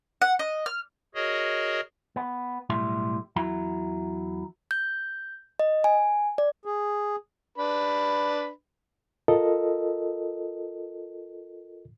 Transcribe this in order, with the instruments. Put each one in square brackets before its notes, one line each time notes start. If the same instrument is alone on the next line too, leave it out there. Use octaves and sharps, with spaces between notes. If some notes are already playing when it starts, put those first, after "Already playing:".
[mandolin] F#5
D#5
F6
[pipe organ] F#4 G#4 A#4 C#5 D#5
[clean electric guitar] B3
B1 A2 G3 E5 C6
E2 F#3 E4 A#5
[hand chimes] G6
D#5
G#5
D5
[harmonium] G#4
[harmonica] D4 B4 B5
[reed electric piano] F4 A4 A#4 D#5